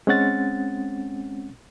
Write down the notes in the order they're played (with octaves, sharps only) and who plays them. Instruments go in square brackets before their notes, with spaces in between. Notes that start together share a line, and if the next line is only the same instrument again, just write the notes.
[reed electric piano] G#3 C4 C#4 F#5 A6